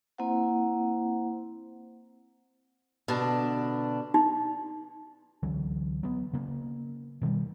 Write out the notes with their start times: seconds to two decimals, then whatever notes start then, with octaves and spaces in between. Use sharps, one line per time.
0.18 A#3 C4 E4 C5 F#5
3.08 B2 D3 D4
4.14 D#4
5.43 C#2 D3 E3 F#3
6.03 F#3 B3
6.33 C#3 A#3
7.22 B2 D#3 F#3 G3